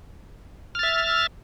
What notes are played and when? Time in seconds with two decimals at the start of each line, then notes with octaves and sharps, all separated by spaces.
0.75 F6
0.79 A6
0.83 E5